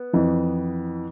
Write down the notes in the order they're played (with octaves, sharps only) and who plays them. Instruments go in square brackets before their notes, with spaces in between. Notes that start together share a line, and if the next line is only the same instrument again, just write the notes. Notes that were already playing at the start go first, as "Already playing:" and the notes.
Already playing: [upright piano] B3
F2 E3